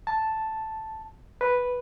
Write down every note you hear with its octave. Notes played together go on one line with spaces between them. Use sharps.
A5
B4